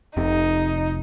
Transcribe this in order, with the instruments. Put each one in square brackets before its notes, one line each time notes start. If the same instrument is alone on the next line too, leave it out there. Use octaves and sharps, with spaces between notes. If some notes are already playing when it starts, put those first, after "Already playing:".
[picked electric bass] F1 C3 [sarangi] D#4